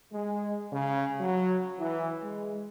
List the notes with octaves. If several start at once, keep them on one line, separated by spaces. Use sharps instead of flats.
G#3
C#3
F#3
E3
G#3